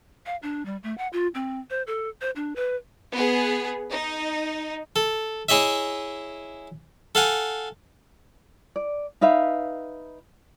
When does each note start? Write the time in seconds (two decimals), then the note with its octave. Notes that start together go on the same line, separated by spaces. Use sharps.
0.26 F5
0.43 D4
0.66 G3
0.83 A3
0.98 F#5
1.13 F4
1.35 C4
1.70 C5
1.87 A4
2.21 C5
2.36 D4
2.56 B4
3.13 B3 G#4
3.91 D#4
4.96 A4
5.49 E4 G#4 C#5 D#5 E5
7.15 A4 F5 F#5 G#5
8.76 D5
9.21 D#4 B4 E5 F5